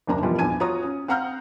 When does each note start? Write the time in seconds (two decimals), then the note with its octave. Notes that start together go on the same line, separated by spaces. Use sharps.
0.07 F#1 D#2 D4 A#5
0.23 B2 E3 F3 G3 A#3 F4
0.39 A#1 E2 G#5 A5 G#6 D#7
0.60 F4 F#4 C#5 A#5 D#6
0.83 C#4
1.08 C4 F5 F#5 A#5 F6 G6